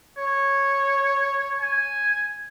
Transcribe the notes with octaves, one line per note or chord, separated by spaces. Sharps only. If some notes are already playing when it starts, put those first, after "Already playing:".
C#5
G#5